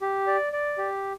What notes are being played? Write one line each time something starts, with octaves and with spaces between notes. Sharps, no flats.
G4
D5
D5
G4